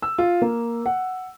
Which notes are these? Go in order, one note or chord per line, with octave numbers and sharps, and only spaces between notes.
E6
F4
A#3
F#5